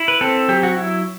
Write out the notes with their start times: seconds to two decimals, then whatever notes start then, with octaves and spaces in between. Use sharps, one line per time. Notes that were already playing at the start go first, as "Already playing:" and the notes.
Already playing: E4
0.08 B4
0.21 C4 A4
0.48 F#3 G4
0.63 F#4
0.77 E4